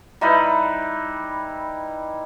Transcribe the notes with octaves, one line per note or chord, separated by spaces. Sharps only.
G3 D#4 E4 B4